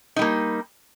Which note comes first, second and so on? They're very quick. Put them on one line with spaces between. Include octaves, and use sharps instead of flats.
D#4 G3 A#3